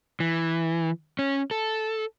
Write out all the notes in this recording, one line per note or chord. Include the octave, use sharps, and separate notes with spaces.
E3
C#4
A4